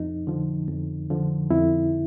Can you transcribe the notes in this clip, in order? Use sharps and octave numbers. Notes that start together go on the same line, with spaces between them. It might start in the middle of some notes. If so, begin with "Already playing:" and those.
Already playing: F2 D#4
D3 F3
F2
D3 F3
F2 E4